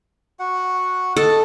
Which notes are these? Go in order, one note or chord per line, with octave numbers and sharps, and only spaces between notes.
F#4 F#5
A4 D#5 E6